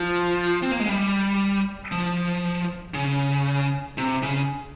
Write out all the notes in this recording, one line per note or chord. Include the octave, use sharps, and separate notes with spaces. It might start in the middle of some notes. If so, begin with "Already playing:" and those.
Already playing: F3
C4
A#3
G#3
G3
F3
C#3
C3
C#3